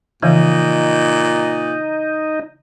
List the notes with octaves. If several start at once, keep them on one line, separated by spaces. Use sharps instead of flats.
A#2 C#3 E3 F3 D#4